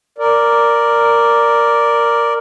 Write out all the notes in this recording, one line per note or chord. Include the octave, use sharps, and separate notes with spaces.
A#4 D5